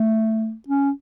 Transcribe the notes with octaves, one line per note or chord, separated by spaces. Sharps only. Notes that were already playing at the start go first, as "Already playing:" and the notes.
Already playing: A3
C#4